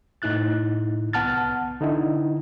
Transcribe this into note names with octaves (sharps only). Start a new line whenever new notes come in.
A2 D#4 E4 F#6 A6
C2 B3 F#5 A5 F6 A6
D3 D#4 E4